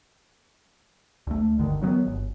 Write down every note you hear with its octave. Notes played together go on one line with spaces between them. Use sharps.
D2 A3
G1 D3 D#3
D#3 F#3 G#3 B3
G1